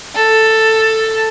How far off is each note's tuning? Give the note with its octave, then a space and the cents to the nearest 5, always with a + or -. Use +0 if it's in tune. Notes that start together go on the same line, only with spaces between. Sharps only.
A4 +10